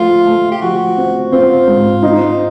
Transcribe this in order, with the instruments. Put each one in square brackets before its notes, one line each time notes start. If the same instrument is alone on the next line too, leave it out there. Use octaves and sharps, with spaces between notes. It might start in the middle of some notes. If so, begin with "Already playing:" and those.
Already playing: [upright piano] F3 A3 [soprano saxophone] F4
[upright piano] A3
[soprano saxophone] G4
[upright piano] F3 [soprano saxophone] F#4
[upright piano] C4
[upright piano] C4 [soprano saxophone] F4
[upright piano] G#2
D#4